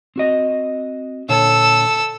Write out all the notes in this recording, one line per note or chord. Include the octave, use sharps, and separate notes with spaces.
C4 F#4 D#5
A#2 D3 A4 C#5 E6